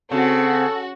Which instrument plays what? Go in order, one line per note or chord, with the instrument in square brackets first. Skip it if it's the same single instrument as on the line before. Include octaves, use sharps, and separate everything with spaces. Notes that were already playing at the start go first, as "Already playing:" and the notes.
[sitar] C#3 [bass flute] C4 [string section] F#4 [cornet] A4